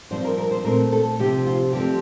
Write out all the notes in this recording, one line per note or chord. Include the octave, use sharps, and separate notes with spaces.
G2 F3 C4 C5
A#4
A#4
C5
A#2 A3 C4 A#4
A4
C3 F3 C4 G4
F4
G2 F3 A3 C4 G4